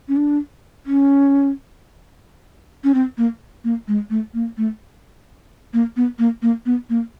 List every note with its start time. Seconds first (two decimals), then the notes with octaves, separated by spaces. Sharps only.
0.08 C#4
0.16 D4
0.86 C#4
2.84 C#4
2.94 C4
3.18 A#3
3.64 A#3
3.88 G#3
4.10 A3
4.34 A#3
4.57 A3
5.73 A#3
5.97 B3
6.19 A#3
6.42 A#3
6.66 B3
6.89 A#3